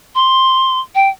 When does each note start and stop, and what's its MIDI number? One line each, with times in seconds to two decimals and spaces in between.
0.15 0.80 84
0.95 1.09 79